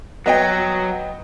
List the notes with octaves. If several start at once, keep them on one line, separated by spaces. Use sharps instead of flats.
F#3 B3 D#5 G5